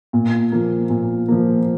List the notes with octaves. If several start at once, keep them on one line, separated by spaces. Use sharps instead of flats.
A#2
F3 A#3
A#2
F3 A#3